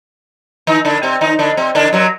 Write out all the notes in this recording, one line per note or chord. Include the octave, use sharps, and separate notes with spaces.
D#3 D#4
D3 D4
C3 C4
D#3 D#4
D3 D4
C3 C4
D3 D4
F#2 F#3